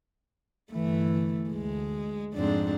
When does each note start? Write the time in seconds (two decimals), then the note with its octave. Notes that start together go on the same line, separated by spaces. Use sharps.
0.71 G1 E3 A3
1.50 D2 G#3
2.34 F2 G#2 C4 D4